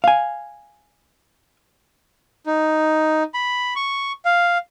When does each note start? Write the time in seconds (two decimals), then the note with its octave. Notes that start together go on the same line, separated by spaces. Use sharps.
0.04 F5 G#5
2.46 D#4
3.34 B5
3.76 C#6
4.25 F5